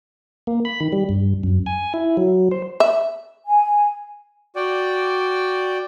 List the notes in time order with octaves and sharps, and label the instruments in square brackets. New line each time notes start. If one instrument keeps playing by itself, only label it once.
[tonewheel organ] A#3
B5
D#3
G3
G2
F#2
G#5
E4
F#3
C5
[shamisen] E5
[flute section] G#5
[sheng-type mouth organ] F#4 D5 G5